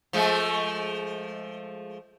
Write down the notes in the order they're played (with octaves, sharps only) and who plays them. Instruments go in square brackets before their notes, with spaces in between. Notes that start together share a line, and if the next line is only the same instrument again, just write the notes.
[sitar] F3 G#3 A3